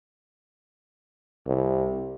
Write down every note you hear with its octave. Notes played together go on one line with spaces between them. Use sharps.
C2